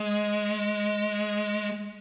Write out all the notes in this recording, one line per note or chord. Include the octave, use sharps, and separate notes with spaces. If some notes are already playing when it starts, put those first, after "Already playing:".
Already playing: G#3